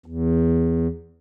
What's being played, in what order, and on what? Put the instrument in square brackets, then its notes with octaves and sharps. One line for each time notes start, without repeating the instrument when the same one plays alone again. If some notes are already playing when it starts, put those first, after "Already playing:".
[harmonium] E2